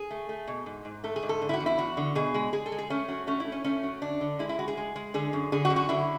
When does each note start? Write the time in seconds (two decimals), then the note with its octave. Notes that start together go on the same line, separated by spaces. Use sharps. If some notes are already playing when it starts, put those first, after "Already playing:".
Already playing: G#4
0.11 A3
0.29 A3
0.47 B2
0.66 G#2
0.85 G#2
1.04 A3 A4
1.16 G#4
1.23 G#2
1.29 A4
1.42 D3
1.49 E4
1.54 F#4
1.60 E2
1.66 E4
1.78 E2 F#4
1.97 D3
2.15 B2 G#4
2.34 G#3
2.53 G#3 G#4
2.66 A4
2.72 G#3
2.79 G#4
2.90 A3 C#4
3.08 F#3
3.27 A3 C#4
3.40 E4
3.47 A3
3.52 C#4
3.64 A3 C#4
3.83 F#3
4.02 D3 D4
4.21 D3
4.39 G#3 E4
4.49 E4
4.59 G#3 F#4
4.68 G#4
4.77 G#3
4.96 G#3
5.14 D3 G#4
5.33 F#2
5.52 D3 G#4
5.65 F#4
5.70 F#2
5.76 F#4
5.89 D3 E4